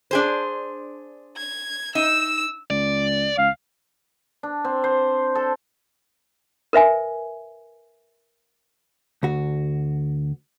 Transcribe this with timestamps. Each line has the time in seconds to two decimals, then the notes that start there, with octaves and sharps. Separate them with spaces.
0.11 D4 G#4 C5
1.37 G#6
1.95 D#4 E6 E7
2.70 C#2 D5
3.38 C#2 F5
4.43 D4
4.64 C4
4.84 C5
5.35 A4
6.73 A#4 B4 E5 G#5
9.23 D2 F#4